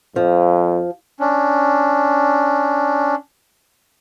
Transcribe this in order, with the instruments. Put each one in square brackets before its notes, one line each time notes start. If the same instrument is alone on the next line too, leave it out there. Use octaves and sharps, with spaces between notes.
[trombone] F2 [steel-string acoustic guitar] F3
[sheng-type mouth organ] C#4 D4